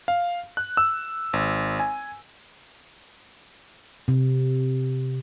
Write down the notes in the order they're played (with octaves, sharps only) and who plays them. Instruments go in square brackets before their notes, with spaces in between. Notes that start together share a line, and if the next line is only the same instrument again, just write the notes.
[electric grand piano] F5
F#6
E6
G#1
G#5
[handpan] C3